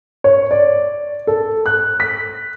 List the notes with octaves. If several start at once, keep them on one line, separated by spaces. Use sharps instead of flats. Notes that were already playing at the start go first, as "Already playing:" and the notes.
C#5
D5
A4
F#6
B6